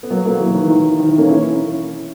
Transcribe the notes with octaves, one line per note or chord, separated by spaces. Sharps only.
B3
F#3 A#3
F#3 A#3
E3
D#3
D#3
D#3
E3
A#3 C#4
C#4 E4